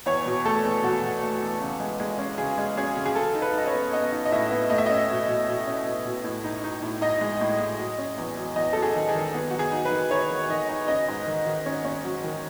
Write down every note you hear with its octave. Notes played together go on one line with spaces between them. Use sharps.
E2 C#5
B2
A3 A4
E2
B2 F#4
B2
A3
E2
C#3
G#3
G#3
C#4
C#3 G#4
G#3
C#4 G#4
C#3
G#4
F#3 A4
D#4
B4
D#4 D#5
C#5
B3
B3 D#5
D#4
D#5
A2 E5
B3
A3 D#5
E5
C#4 D#5
B2
B2
B2
C#4
B2
B2
A2
D#4
D#4
A2
D#4 D#5
G#3
A2
A2
F#3
C#4
E2
F#3
E2 D#5
F#3 A4
G#4
D#3
G#4
D#3
B3
F#3 F#4
G#4
D#4
B4
D#3
D#4 C#5
D#3
D#3 D#5
D#4
C#4 D#5
G#2
D#3
D#3
C#4
C#4
F#3
D#3